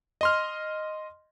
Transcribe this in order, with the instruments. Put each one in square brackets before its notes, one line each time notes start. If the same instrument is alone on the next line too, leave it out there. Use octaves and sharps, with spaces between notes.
[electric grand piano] D#5 C6 F6